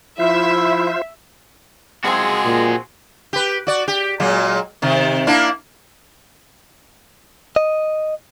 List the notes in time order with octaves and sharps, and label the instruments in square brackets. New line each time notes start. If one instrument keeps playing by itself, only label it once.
[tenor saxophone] F3 [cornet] E4 [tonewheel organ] F4 C5 [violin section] E5
[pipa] F3 C4 [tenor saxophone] G#3 [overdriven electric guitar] F#4 G#4
[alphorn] A#2
[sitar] G4 B4
F#4 D5
G4
A#2 F#3 G#3
C3 D#3
A#3 D4 E4
[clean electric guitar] D#5